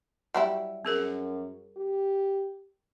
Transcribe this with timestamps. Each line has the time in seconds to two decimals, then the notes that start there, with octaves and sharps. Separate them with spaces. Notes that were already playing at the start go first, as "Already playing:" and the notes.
0.34 F#3 G3 E4
0.85 F#2 C4 G#4 A#4
1.76 G4